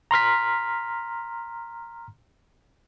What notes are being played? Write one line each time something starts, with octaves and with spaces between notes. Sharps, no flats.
A#5 C6 F6 B6